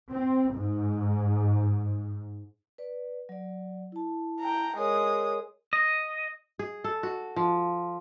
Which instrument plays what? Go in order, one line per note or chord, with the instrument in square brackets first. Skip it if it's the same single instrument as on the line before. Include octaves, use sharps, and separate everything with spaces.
[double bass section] C4
G#2
[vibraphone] B4 D5
F#3 D5
E4 A5
[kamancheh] G5 A#5
[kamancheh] G#3 D#6 [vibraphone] G#4 A#4 C#5
[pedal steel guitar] D#5
[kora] G#4
A4
F#4
F3